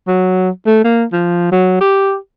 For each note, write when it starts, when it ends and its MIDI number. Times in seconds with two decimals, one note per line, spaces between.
0.08 0.50 54
0.67 0.81 57
0.84 1.04 58
1.13 1.47 53
1.52 1.79 54
1.81 2.16 67